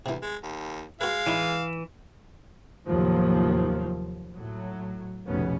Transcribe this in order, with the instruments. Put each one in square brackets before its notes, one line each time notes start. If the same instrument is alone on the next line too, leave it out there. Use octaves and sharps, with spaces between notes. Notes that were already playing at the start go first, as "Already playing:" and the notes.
[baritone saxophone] D2 [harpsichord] C3 E3
[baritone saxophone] G#3
D#2
[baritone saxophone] G#3 [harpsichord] F#4 B4 [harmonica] F5
[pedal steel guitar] E3 [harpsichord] C#4 D#4 E4
[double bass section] D#2 A2 C3 F3 F#3
A2 F#3
F1 B1 B2 D3 B3 C#4